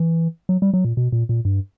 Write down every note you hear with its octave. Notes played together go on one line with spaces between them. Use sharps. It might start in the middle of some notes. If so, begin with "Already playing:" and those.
Already playing: E3
F#3
G3
F#3
A#2
B2
A#2
A#2
G2